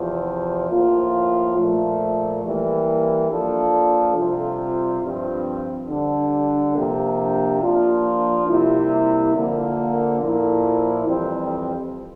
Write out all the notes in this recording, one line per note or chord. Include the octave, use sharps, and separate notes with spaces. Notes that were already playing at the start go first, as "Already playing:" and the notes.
Already playing: E2 C3 F3
A2 F3 A#3 F4
A#2 F3 A3
E3 G3 A#3
F3 A#3 D4 A4
C3 G3 C4 F4
G2 F3 C4
D3 G3 D4
C3 F3 A#3 D4 G4
F3 A#3 D4 F4
C3 G3 A#3 E4
D3 F3 A#3
A#2 F3 A#3 E4 A4
F2 E3 G3 C4